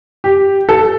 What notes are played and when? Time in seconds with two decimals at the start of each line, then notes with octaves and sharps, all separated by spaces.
0.24 G4
0.69 A4